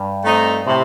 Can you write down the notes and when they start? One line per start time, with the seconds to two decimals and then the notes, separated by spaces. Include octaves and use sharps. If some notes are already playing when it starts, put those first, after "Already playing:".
Already playing: G2
0.24 A3 C4 D#4
0.67 A2 C3